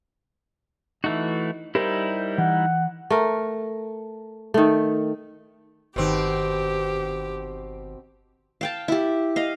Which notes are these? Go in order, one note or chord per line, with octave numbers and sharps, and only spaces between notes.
E3 A3 D#4 F#4
G3 D#4 E4 G4 A#4 C5
E3 F#5
A3 A#4
D#3 A3
G1 B2 D#3 C4 G4
F5 G5 A5
E4 G4
D#5 F5